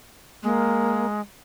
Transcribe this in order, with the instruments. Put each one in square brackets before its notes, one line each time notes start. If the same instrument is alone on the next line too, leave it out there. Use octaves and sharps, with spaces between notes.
[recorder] G#3 [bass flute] A#3